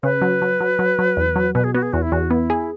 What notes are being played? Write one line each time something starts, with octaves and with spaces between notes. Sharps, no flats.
C#3 B4
F#3
F#3
F#3
F#3
F#3
E2
F#3
B2 B4
G#4
B3 F#4
G#4
E2 F#4
E4
E2 F#4
B3 E4
G#4